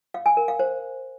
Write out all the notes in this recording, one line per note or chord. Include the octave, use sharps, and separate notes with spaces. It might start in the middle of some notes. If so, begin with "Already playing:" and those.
F5
G#5
A#4
F5
C5